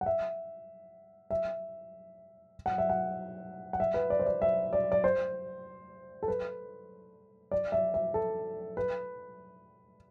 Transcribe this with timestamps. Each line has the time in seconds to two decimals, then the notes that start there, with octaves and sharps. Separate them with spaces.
0.01 F#5
0.06 E5
1.31 E5
2.66 F#5
2.78 E5
2.90 F#5
3.73 F#5
3.80 E5
3.94 B4
4.10 D5
4.20 C5
4.26 D5
4.42 E5
4.73 D5
4.92 D5
5.04 C5
6.23 A4
6.28 B4
7.52 D5
7.72 E5
7.94 E5
8.14 A4
8.77 B4